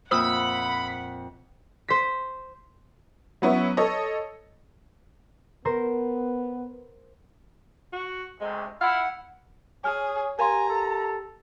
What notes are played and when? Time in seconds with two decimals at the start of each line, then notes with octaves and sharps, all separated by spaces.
0.11 F2 A#2 C5 E5 F#5 B5 D#6 E6
1.88 C5 B6
3.42 F#3 B3 C#4 E4
3.77 A4 C#5 D#5
5.65 B3 A#4 C5
7.93 F#4
8.41 D2 C3 G#3
8.81 E4 F5 F#5
9.84 G#4 C#5 G#5 F6
10.39 G4 A#4 F5 G#5 A#5 C6
10.69 A4